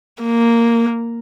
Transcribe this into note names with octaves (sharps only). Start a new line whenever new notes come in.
A#3